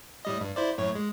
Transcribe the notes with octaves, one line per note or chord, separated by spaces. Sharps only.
A2 G3 D#5
G2
E4 C5 D5
F#2 A2 C#5
G#3